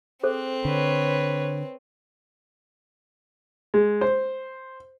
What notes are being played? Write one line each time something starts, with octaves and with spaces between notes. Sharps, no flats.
C4 G#4 A4 C5
D3 B4 C#5
G#3
C5